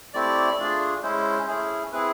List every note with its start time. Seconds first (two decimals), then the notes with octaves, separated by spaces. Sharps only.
0.14 A3 C4 E4 G4 D5
0.58 A3 D4 F4 G#4
1.03 G#3 C#4 E4 C5
1.47 A3 C#4 E4 G#4
1.92 C4 E4 G#4 B4